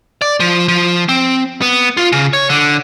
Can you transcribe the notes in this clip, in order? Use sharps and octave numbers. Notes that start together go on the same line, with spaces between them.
D5
F3
F3
C4
B3
F4
C#3
C#5
D3